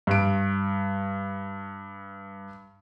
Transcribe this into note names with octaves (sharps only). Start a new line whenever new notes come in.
G2 D7